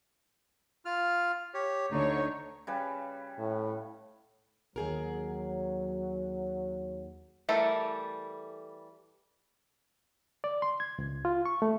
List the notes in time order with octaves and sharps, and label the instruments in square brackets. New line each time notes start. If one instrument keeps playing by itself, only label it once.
[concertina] F4 F6
G4 C#5
[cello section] D2 D3 C#5 [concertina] D#4
[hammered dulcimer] C#3 G3 B4
[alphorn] A2
[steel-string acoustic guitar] D#2 G#4 A#4 [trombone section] F#3
[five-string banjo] E3 G3 A3 A4 A#4
[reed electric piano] D5
C6
G#6
C#2
F4
C#6
A3